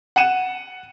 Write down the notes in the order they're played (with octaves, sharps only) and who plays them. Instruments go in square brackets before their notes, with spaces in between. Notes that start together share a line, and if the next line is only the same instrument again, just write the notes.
[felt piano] F#5 C#7 D#7 E7